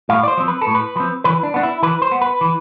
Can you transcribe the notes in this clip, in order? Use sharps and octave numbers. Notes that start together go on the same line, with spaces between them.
A2 F5
D5
C5
F3 C4
B4
A4
A2
B4
F3 C4
E3 B4
D4
B3 D4
E4
E3 B4
C5
B3
B4
E3